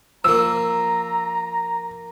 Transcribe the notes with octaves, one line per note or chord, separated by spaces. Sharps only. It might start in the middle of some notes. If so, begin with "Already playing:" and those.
F3 A#3 A#5 E6